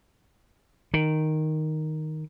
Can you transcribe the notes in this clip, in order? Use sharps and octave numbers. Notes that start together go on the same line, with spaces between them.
D#3